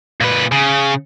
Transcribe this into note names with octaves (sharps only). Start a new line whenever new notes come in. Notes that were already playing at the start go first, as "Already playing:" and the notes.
A#2 B4
C#3